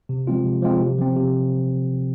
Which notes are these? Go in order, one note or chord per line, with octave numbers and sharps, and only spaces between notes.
C3
F3 G#3 C4 F4
C3
F3 G#3 C4 F4
C3
F3 C4
C3